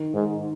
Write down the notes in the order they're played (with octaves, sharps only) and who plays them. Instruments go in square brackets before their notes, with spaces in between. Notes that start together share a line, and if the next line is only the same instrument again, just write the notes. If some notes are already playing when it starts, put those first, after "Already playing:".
Already playing: [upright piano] D#3
[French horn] G#2